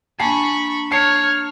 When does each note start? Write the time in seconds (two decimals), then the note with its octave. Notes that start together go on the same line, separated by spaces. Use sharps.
0.20 A#3 D4 G#5 A5 B5 C#6 C7
0.91 C#5 A5 F6 C7 C#7